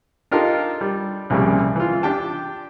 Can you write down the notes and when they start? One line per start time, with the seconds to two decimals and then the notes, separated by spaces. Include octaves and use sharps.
0.31 D4 D#4 F4 G4 A4 A#4
0.81 G3
1.30 C2 A#2 C#3 F3 G3
1.76 E3 F4
2.03 D4 G4 G5 A5